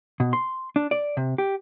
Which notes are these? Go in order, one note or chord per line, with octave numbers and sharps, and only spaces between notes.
B2
C6
D4
D5
C3
G4